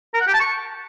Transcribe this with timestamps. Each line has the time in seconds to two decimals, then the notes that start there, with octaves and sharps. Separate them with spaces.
0.14 A#4
0.21 F#5
0.27 G4
0.34 A5
0.41 C#6